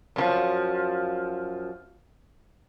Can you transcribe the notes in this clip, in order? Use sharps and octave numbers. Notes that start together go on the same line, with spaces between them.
F#2 C#3 F3